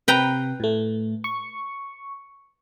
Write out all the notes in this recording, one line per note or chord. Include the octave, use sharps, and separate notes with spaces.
C3 B4 G5 A#5
A2 A3
C#6